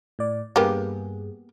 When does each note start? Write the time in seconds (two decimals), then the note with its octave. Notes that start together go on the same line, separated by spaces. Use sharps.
0.19 A2 D5
0.56 G2 A#3 B3 G4 G#4